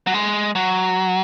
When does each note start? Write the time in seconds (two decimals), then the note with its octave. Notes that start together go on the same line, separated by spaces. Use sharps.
0.07 F#3
0.14 G#3
0.55 F#3